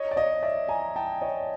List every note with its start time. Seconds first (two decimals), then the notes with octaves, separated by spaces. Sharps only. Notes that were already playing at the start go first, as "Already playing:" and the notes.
Already playing: C#5 D#5
0.11 D5
0.16 C#5 D#5
0.43 D5 E5
0.69 G#5 A#5
0.96 G5 A5
1.21 C#5 D#5